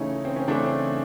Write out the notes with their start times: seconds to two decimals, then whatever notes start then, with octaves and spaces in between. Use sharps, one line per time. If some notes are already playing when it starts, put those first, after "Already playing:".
Already playing: C#3 E3 A3 C#4 D#4
0.25 C4
0.36 C#4
0.48 C#3 E3 A3 C4 D4